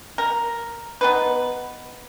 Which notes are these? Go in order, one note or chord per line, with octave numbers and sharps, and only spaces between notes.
A#4
B3 D#4 B4